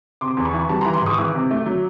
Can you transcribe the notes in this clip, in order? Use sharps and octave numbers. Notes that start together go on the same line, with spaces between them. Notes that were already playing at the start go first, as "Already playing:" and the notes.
C3 C6 D6
E2
B5 C#6
E3
G3 A5 B5
E3 A#5 C6
C6 D6
G#2 C#6 D#6
E3 D6 E6
C3
A3
F#3